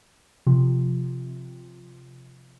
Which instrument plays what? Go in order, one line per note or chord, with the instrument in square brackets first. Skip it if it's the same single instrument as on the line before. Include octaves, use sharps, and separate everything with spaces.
[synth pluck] C3 F3